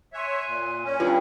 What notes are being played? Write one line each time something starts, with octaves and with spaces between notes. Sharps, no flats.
C#5 E5 G#5 C6 F#6
A#2
C#4
G2 F4